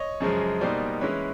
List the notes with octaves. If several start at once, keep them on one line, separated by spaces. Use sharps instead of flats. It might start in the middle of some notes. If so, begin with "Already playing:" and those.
Already playing: C#5 D#5
F#2 C#3 F3 G#3
B2 G3 A#3 D#4 C5 D5
E3 G#3 C#4 E4 B4 C#5